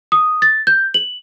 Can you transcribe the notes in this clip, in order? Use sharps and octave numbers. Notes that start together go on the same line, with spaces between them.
D#6
A6
G6
F#7